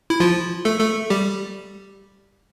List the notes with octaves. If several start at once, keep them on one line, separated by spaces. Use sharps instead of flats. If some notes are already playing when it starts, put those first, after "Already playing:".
E4
F3 F4
A3 A4
A3 A4
G3 G4